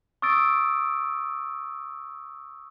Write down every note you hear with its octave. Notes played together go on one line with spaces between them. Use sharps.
C#6 D#6 E6 A6 D7